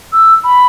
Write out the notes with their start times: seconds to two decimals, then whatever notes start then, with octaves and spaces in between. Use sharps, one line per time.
0.12 E6
0.44 B5